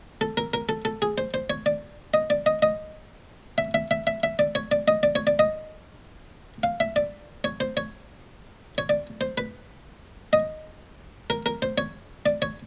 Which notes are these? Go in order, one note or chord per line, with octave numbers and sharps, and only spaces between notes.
A4
A#4
A#4
A4
A4
G#4
C5
C5
C#5
D5
D#5
D5
D#5
D#5
E5
E5
E5
E5
E5
D5
C#5
D5
D#5
D5
C#5
D5
D#5
F5
E5
D5
C#5
C5
C#5
C#5
D5
C5
B4
D#5
A#4
A#4
C5
C#5
D5
C#5